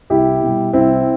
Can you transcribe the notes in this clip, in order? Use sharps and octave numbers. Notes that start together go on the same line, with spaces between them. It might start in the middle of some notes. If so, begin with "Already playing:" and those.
C2 E4 G4
B2 G3
C2 C4 E4